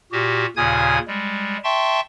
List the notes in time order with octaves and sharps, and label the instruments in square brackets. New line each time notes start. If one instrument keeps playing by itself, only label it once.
[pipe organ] A#2 F#4 G4
D#2 A#2 C#3 G#5 D#6 G#6
G3 G#3
E5 G5 A5 C6 C#6